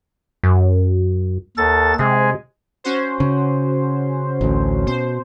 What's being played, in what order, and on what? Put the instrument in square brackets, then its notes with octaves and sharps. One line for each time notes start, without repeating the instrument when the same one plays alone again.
[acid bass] F#2
[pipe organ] D#2 A4 A6
[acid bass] C3 [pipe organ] G#3 G#4
[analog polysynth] C#4 F#4 C5
[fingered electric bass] C#3
A1 D2
[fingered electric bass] B2 [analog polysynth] C5